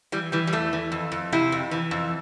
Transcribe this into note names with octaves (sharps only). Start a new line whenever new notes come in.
E3 G3
E3 G3
G3
E2 A3
E3
F2
F2
C3 E4
F2
E3
F2